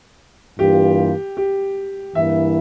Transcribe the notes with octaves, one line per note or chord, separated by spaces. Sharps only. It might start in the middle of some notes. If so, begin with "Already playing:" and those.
G2 E3 A#3 F4 G4
G4
G2 E3 A#3 E4 E5